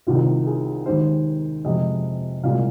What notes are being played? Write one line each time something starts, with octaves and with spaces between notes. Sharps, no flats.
C2 C3 D#3 F4
G#4
D#2 D#3 G#3 C5
F2 C3 G#3 D#5
C2 A#2 G#3 F5